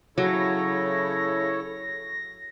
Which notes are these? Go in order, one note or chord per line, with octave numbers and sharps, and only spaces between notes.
C#3 F#3 E4 A4 C#5 A#6